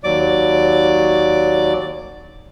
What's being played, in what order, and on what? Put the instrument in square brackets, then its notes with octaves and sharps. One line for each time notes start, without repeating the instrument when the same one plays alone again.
[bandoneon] D#2 F#3 D5 D6